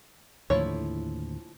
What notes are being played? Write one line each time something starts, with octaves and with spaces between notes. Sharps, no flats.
D#2 A2 D3 F3 E4 C#5